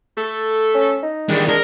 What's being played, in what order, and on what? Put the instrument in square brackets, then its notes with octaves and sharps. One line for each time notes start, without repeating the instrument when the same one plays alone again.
[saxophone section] A3 A4
[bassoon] C#4
D#4
[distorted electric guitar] D#3 G3 [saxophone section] G#3 D4
[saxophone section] G#3 [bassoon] D4 [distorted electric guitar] A#4